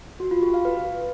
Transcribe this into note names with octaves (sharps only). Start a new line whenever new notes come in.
F#4
F4
G4
F5
B4